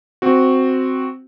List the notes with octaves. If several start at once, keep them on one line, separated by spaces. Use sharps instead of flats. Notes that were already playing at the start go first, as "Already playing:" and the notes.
C4 F#4